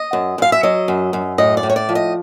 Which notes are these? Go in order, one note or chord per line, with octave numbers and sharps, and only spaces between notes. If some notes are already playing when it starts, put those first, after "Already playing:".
Already playing: D#5
F#2
F#2 F5
E5
F#3 D#5
F#2
F#2
A2 D#5
D5
A2
C#5
D5
F3
D#5